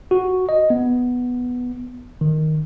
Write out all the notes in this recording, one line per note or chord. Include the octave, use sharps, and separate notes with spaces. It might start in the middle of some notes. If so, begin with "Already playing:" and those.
F#4
D#5
B3
D#3